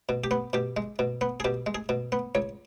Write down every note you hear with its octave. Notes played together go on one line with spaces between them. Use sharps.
B2
G4
B3
B2 G4
G#3
B2
B3
G#4
B2 G4
G#3
G#4
B2
B3
C#2 C#5